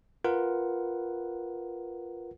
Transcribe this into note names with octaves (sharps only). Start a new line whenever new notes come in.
F4 A#4 B4 F#5